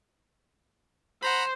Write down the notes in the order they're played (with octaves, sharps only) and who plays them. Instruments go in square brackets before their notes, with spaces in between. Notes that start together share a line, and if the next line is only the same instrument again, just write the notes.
[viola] C5 [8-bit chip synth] F#5 A#5 B5